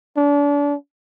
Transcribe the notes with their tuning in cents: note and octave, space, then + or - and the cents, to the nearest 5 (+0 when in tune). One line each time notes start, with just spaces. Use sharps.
D4 -35